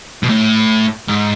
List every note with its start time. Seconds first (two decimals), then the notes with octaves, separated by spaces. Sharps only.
0.23 B2
0.29 A2
1.09 G#2